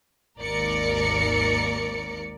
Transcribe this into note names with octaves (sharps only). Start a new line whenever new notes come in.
G#1 D#2 A#4 D5 C#7